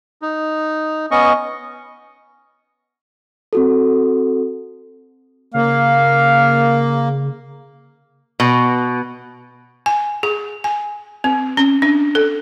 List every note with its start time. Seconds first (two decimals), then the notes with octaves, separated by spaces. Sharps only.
0.22 D#4
1.11 B3 C#4 D#5 C#6
3.53 C4 F#4 A4
5.54 C#3 A#3 F5
8.40 B2
9.86 G#5
10.23 G#4
10.64 G#5
11.24 C4
11.57 C#4
11.82 D4
12.15 A4